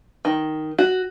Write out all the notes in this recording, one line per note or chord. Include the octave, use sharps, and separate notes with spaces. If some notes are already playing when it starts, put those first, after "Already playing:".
D#3
F#4